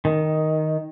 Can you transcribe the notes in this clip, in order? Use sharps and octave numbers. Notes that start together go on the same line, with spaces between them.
D#3